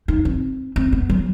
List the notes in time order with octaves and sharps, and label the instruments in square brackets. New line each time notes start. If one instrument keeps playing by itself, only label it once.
[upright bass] D#4
C4
C4
B3
F#3